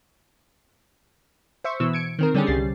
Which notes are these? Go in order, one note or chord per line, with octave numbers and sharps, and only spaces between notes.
C5 E5 C#6
B2 E3 E6
G#6 C#7 D7
D#3 C4 A#4
D3 G3 C#4 G4 G#4
C2 G3 A6 C7